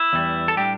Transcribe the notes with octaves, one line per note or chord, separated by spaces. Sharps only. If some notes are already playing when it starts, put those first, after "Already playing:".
Already playing: E4
E2 E3 G3
A4
A2 G3 D4 G4